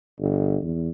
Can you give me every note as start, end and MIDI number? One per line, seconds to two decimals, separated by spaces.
0.20 0.58 31
0.63 0.89 40